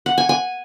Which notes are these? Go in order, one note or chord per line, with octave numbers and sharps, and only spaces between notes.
F#5
G#5
G#5